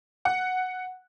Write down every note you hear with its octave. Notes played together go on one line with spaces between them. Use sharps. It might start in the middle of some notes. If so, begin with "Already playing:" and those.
F#5